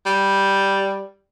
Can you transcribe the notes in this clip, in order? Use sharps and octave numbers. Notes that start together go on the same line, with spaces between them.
G3